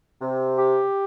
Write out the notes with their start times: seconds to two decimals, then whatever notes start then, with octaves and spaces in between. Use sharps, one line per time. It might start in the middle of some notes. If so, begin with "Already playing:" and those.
0.20 C3
0.58 G4